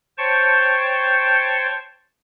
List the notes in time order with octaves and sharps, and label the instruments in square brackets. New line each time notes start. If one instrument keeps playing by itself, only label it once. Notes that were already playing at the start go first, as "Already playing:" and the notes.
[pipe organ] C5 C#5 G5 A5 C#6